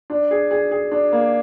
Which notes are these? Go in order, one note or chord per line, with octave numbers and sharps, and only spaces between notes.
D4
G#4
G#4
G#4
D4
A#3